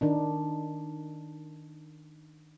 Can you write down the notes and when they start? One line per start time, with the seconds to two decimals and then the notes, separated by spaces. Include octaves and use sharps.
0.01 D#3 D4 D#4